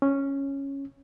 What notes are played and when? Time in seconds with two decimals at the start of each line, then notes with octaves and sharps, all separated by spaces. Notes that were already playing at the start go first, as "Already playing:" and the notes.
0.02 C#4